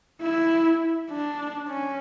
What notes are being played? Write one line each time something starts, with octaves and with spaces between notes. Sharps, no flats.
E4
D4
C#4